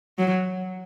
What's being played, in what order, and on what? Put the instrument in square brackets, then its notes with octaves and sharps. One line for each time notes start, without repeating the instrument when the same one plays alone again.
[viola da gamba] F#3